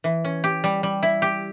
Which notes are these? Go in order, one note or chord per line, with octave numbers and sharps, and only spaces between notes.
E3
C#4
G4
G3
G3
E4
G4